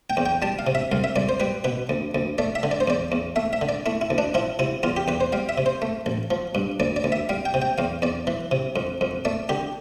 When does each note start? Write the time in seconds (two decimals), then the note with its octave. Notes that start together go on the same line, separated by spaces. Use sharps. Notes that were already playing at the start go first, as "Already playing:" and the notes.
0.10 G5
0.17 E2
0.26 G5
0.42 G3 A5
0.59 F5
0.67 C3
0.75 E5
0.92 C2 F5
1.04 E5
1.16 C2 D5
1.29 C5
1.40 G3 B4
1.64 B2 B4
1.89 D2
2.15 D2
2.38 A3 D5
2.55 E5
2.63 D3
2.71 D5
2.80 C5
2.88 E2 D5
3.12 E2
3.36 A3 E5
3.53 E5
3.61 D3
3.69 D5
3.86 A3 E4
4.01 E4
4.10 D2
4.18 D4
4.34 F3 E4
4.59 C3 E4
4.83 E2 F4
4.97 G4
5.08 E2 B4
5.20 C5
5.32 G3 F5
5.49 E5
5.58 C3
5.66 C5
5.82 A3
6.06 A1
6.31 F3
6.55 G2
6.80 D2 D5
6.96 D5
7.04 D2
7.12 E5
7.29 G3 F5
7.45 G5
7.54 C3
7.62 G5
7.78 E2 F5
8.02 E2 D5
8.27 E3
8.51 C3
8.76 F2
9.01 F2
9.25 A3 D5
9.49 D3 G4